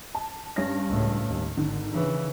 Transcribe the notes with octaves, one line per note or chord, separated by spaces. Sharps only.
A5
G2 C#4 A#6
C#2 A2
D#2
G#1 D3 D#3
C#3 E3